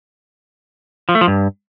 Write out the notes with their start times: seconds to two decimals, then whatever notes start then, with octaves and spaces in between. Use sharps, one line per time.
1.09 F3
1.15 A3
1.21 F3
1.28 G2